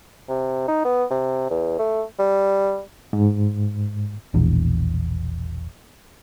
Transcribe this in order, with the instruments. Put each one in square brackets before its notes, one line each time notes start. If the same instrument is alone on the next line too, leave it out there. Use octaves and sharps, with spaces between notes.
[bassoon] C3
D#4
B3
C3
E2
A3
G3
[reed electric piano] G#2
[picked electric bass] E1 A#1 E2